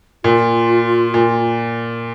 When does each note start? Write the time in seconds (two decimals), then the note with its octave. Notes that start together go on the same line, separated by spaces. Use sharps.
0.24 A#2 F4
1.14 A#2